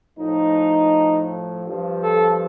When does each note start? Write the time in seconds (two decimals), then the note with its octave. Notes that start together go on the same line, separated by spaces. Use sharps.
0.18 A2 F3 D#4
1.66 G2 F3
2.02 A4